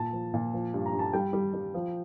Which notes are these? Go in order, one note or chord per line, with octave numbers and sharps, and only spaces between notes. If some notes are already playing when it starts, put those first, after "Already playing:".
Already playing: A#2 A5
F3
A#2
F3
G2
A#5
G2
A5
G3 G5
G3
G3
F3